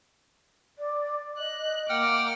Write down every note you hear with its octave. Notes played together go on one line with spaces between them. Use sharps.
D5
D#5 F#6
A#3 F#5 G5 D6 F6